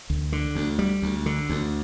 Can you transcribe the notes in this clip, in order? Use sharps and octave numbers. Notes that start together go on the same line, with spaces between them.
D2
D3
D2
G3
D2
D3
D2